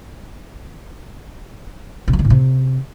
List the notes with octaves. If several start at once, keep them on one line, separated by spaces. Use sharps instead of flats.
B2
F#3
D3
A2
C3